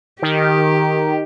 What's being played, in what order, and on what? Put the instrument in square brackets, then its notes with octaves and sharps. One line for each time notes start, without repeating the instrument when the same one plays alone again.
[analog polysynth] D#3 [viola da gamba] G4